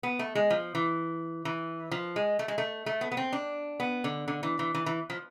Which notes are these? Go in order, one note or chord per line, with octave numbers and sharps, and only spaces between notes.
B3
A3
G#3
F3
E3
E3
F3
G#3
A3
G#3
A3
A3
B3
B3
C4
D4
B3
D3
D3
E3
E3
E3
E3
F3